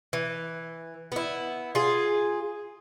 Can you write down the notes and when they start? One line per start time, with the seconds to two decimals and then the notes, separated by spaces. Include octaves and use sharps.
0.13 E3
1.12 B3 E4
1.75 F4 G#4